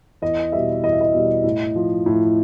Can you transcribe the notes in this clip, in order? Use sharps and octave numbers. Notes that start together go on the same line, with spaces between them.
E2 D#5
B2 G3 E5
E2 D#5
E5
D#5
B2 G3
A2
F3
A2